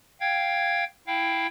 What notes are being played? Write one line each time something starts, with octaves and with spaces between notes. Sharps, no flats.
F5 G5 G#6
E4 F5 G5